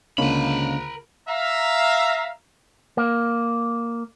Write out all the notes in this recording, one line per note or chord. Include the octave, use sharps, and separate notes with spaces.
C#2 D3 A#3 C#4 A#4 B5
E5 F5 A#5
A#3